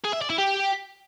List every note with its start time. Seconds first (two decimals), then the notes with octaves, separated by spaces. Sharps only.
0.04 G#4
0.13 E5
0.21 D5
0.30 E4
0.38 G4